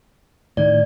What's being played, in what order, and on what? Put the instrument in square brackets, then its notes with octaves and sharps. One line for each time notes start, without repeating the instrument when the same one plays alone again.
[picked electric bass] A2 D#3 [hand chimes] D5 G#6